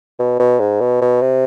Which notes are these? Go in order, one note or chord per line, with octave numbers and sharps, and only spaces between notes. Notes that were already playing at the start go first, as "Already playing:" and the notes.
B2
B2
G#2
B2
B2
C3